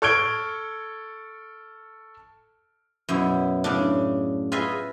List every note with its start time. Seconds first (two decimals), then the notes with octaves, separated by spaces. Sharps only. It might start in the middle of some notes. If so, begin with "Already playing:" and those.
0.02 A4 C#6 F6 G#6 D7 G7
3.09 F#2 B2 E4
3.64 A2 C#3 D4
4.52 F4 G#4 B4 D#5 E5